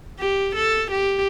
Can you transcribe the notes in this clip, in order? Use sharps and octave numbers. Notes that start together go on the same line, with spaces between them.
G4
A4
G4